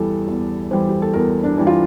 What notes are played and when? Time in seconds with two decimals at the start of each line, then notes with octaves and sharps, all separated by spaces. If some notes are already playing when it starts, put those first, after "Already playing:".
Already playing: E2 E3 G3 A4
0.27 E2
0.71 E3 G3 C5
0.89 G4
1.02 A4
1.13 E2 A#4
1.44 D4
1.57 E3 G3
1.67 F4